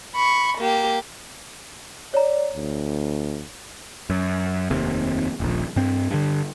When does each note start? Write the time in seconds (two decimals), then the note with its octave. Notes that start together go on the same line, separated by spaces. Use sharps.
0.15 B5 C#6
0.58 A#3 G4
2.14 C#5 D5 A#5
2.55 D2
4.10 F#2
4.70 F1 D#2 C3
5.40 D#1 A#1
5.76 G2 C4
6.11 G2 D3